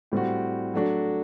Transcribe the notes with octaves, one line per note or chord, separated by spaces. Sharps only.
A2 G3 C4 F#4
F#3 A3 D4 F#4